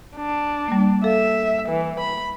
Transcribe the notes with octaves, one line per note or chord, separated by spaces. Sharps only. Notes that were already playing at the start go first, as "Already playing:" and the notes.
D4
G3 A#3
A4 E5 F5
E3
B5